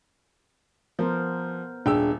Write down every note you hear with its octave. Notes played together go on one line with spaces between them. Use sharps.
F3 B3 A#4 C5
D#1 D4 G#4 G5 E6